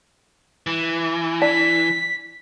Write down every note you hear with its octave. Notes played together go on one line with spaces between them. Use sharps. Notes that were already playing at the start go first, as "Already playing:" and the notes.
E3
D4 B6